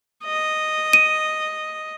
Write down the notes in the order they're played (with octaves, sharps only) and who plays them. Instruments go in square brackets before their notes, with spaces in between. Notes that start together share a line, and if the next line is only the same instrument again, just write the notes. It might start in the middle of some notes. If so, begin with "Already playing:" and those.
[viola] D#5
[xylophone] D#7